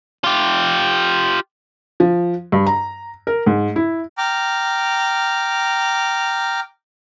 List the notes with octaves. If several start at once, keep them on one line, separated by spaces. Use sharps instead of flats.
F4 G4
F3
G2
A#5
A#4
G#2
E4
G5 A#5 D6 F6